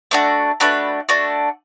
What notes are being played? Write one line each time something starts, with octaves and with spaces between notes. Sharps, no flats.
A3 D4 F#4 D5
A3 D4 F#4 B4
A3 D4 F#4